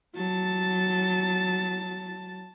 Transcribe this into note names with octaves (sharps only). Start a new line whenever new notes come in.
F#3 A5